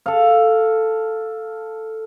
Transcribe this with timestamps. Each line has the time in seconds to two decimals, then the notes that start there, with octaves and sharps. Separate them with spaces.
0.06 A4 F5